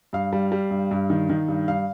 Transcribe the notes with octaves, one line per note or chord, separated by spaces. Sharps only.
G2 F5
G3
G3
G2
G2
D#3
D#3
G2
G2 F5